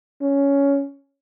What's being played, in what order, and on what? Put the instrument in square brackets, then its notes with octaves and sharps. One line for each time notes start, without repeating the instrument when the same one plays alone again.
[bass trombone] C#4